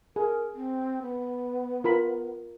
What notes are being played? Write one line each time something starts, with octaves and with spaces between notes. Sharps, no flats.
G#4 A#4
C4
B3
F4 A#4 B5